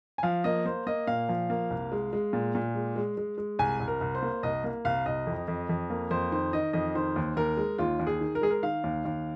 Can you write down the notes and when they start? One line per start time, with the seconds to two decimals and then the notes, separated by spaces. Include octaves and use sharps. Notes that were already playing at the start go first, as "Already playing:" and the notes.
0.18 G#5
0.23 F3 F5
0.44 A#3 D#5
0.66 A#3 C5
0.87 A#3 D#5
1.07 A#2 F5
1.29 F3
1.50 A#3
1.70 C2
1.92 G#3
2.13 G#3
2.33 A#2
2.55 A#2
2.75 G#3
2.96 G#3
3.17 G#3
3.38 G#3
3.59 C2 G#5
3.80 C2
3.88 A#4
4.01 C2
4.15 C5
4.22 A#3
4.43 C2 D#5
4.64 A#3
4.85 C2 F5
5.06 C2 D#5
5.27 F2
5.48 F2
5.69 F2
5.90 A#3
6.11 F2 C5
6.32 D#3 C5
6.53 D#3 D#5
6.73 F2 D#5
6.95 D#3 C5
7.16 D#2
7.36 D#2 A#4
7.57 G#3
7.78 D#2 F4
7.99 D#2
8.07 G#4
8.21 D#3
8.35 A#4
8.41 G#3 G#4
8.51 A#4
8.63 D#3 F5
8.84 D#2
9.05 D#2